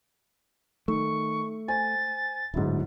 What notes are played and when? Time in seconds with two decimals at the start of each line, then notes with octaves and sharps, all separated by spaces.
0.88 D#3 A3 C#6
1.68 C5 G#5 A6
2.54 D1 D2 G#2 F#3 E4